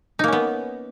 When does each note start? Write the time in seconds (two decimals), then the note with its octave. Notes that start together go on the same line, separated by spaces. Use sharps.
0.19 D#4
0.24 A#3
0.28 C#4
0.33 B3